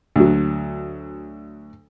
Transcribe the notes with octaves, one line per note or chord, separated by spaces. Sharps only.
D2 F#3